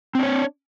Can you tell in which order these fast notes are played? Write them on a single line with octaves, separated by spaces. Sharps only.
C4 D4 C#5